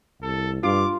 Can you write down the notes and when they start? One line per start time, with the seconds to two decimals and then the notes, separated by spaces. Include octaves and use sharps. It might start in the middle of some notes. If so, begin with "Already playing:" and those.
0.22 C2 A4
0.63 G2 F4 D6